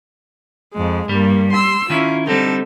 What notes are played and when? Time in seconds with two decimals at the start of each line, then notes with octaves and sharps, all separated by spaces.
0.75 F2 G#3
1.09 G2 G3 A#3
1.53 C6 E6
1.90 D#3 C#4 E4 F4
2.27 D3 G3 C4 D#4 A4